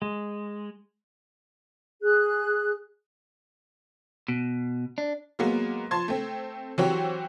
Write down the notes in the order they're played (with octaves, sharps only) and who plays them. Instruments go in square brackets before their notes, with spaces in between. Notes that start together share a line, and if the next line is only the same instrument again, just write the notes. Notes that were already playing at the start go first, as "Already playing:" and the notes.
[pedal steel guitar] G#3
[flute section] G#4 F#6
[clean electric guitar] B2
D4
[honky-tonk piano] F#3 G#3 A#3 B3
F3 A5 C6 G#6
A3 C4
E3 F#3 C4 F#4 G4 C#5